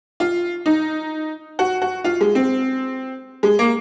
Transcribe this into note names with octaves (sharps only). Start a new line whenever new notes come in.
F4
D#4
F#4
F#4
F4
G#3
C4
G#3
A#3